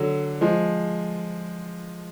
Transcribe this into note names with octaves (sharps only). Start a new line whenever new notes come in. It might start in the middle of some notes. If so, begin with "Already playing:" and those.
Already playing: D3 F#3
F3 G#3